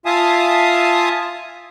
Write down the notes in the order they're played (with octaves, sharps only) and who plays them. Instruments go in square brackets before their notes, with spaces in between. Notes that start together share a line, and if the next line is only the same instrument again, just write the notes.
[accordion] F4 E5 F5 G#5 A5 D#6